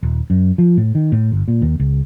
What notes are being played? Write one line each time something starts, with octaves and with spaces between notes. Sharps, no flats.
D#1
F#2
F3
A2
D#3
A2
G1
A#2
D#2
C#2